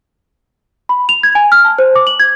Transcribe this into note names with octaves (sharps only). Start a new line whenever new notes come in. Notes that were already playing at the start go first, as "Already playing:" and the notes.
B5
F7
G#6
G#5
F6
A5
C5
D6
F#7
G#6